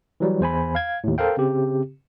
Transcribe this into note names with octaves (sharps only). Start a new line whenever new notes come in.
E3 F#3 G3
E2 C5 G#5 B5
F5 G#6
D#2 A2
A4 A#4 C5 F5 G5
C#3 C4 G4